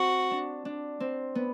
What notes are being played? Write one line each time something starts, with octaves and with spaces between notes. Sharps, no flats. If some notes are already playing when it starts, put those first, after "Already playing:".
Already playing: C4 F#4
D4
D4
C4
B3